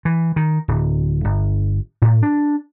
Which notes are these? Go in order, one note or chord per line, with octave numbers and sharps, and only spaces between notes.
E3
D#3
D1
G1
A2
D4